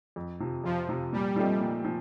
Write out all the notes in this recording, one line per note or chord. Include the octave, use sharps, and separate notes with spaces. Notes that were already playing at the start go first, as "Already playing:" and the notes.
F2
C3 F3
F2 F3
C3 F3
A#2 G3
F3 A3 C4 D#4
A#2
F3